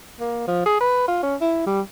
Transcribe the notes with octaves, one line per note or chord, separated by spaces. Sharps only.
A#3
F3
G#4
B4
F4
C#4
E4
G3